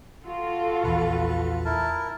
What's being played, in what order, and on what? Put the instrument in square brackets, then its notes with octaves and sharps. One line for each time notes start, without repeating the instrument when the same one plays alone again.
[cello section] F4 F#4 A4
[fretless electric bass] A#1 E2 [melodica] B4
[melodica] E4 A#4 A5